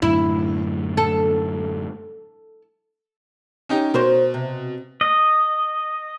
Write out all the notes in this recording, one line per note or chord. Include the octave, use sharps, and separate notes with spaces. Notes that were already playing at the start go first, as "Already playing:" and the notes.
F#2 A2 D3 E4
A4
C#4 D#4 G4
B2 A#4 C5 C#5
C3
D#5